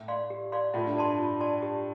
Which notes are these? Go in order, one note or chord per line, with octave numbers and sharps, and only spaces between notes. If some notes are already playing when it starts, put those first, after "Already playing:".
Already playing: A2
D5 F5 C6
G4
D5 F5 C6
A2 F4
G2
G2 D5 A5 C6
F4
D5 A5 C6
G4